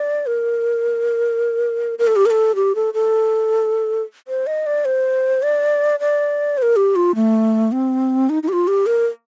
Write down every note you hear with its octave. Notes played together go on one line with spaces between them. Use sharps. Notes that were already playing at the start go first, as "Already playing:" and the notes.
Already playing: D5
A#4
A#4
A4
G4
A#4
A4
G4
A4
A4
C5
D#5
D5
C5
D5
D5
C5
A#4
G4
F4
A3
C4
D#4
D#4
G4
F4
G4
A#4